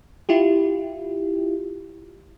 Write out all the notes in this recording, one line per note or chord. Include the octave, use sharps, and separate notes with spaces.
E4 F4 G4